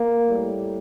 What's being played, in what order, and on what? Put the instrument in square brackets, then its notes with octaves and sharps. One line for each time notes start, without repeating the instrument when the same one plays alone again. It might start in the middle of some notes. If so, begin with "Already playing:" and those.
Already playing: [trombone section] A#3
A2 G3